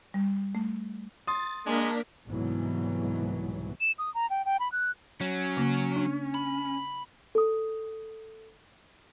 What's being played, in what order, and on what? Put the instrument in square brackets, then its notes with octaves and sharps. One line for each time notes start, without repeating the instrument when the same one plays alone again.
[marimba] G3
A3
[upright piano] C6 D#6 [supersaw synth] A6
[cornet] G#3 [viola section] A#3 A#4 [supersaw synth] D4 B6
[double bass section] C2 G#2 B2 E3 F#3
[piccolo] E7
D#6
A#5
G5
G5
B5
F#6
[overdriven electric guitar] F#3 [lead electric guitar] C#4
[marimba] C#3 A#3
D4
[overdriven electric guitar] B5
[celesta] A4 D#6